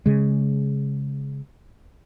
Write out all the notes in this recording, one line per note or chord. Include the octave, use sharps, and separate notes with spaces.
C#3 G#3